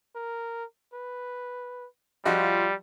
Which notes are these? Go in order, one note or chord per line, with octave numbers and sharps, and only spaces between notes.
A#4
B4
F3 G3 F4 F#4 D#5